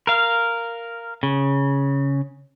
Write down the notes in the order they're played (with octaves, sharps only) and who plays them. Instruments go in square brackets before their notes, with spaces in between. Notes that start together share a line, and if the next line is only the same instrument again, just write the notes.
[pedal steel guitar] A#4 F5
C#3